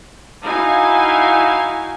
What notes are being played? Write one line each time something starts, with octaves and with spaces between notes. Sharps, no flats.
D#4 E4 F#4 F5 G#5